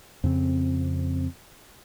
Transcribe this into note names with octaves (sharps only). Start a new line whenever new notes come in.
F2 C#3 C4